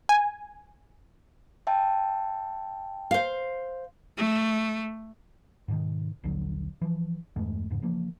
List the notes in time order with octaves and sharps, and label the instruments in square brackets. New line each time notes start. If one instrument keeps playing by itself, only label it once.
[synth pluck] G#5
[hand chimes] E5 G5 A5
[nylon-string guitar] C5 F5
[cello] A3
[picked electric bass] G#2 B2 D3 D#3
A#1 D#2 D3 F#3
E3 F3
E2 G2 G#3 A3
E2 G#2 C#3
C#3 E3 F3 A#3